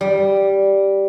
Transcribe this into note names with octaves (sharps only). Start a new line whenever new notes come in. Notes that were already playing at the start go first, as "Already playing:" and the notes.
G3